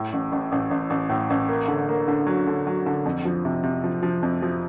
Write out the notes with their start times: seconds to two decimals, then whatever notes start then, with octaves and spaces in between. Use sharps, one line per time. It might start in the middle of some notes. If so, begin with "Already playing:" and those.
Already playing: A2
0.13 A1
0.32 A1
0.52 A1
0.71 A1
0.90 A1
1.09 A2
1.30 A1
1.48 A#3
1.68 D3
1.89 A#3
2.08 D3
2.27 F#3
2.47 D3
2.67 F#3
2.86 D3
3.05 F2
3.25 F3
3.45 C3
3.64 C3
3.84 F3
4.02 F3
4.22 F2
4.42 F3